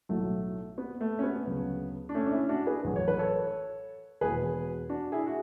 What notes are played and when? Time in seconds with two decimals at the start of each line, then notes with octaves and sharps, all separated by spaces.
0.09 B1 A2 F#3 A3
0.78 B3
1.01 A3
1.19 C#4
1.23 B3
1.46 D2 C#3 F#3
2.09 D4
2.15 A3 C#4
2.26 D4
2.32 C#4 E4
2.49 D4 F#4
2.67 G#4 B4
2.84 A1 A2 F#3
2.96 C#5
3.08 B4
3.19 A4 C#5
4.21 E1 E2 B2 G#4 B4
4.89 D4 F#4
5.12 E4 G#4
5.27 F#4